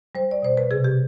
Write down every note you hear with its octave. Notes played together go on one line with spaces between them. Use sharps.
G3 C5
D5
B2 C5
B4
C3 G#4
G4